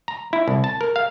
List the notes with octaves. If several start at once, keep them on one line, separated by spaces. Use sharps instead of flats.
A#5
E4
C2
A5
A#4
F5